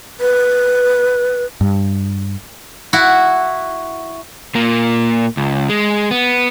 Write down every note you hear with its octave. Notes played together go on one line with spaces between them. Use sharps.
B4
G2
E4 F#4
A#2 A#3
C#2
G#3
B3